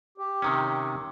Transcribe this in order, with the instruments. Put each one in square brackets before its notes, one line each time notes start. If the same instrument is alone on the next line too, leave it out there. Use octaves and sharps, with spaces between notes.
[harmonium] G4
[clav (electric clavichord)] C3 D#3 C#4